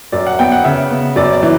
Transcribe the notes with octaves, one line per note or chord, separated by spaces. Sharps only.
F#2 D5
F#5
B3 G5
F#5
C#3 E5
B3
F#2 D5
D5
E3